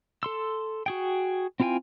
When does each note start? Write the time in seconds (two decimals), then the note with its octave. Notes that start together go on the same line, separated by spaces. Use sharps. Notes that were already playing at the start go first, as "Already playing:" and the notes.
0.23 A4 C6 E6
0.86 F#4 G#4 G5
1.60 C4 E4 F4 G5 G#5